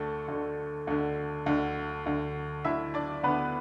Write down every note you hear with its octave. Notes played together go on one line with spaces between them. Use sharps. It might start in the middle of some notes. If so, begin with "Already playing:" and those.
Already playing: D2 D3 A3 A4
D2 D3
D2 D3
D2 D3
D2 D3
D2 D3 E4 E5
D4 D5
D2 D3 B3 B4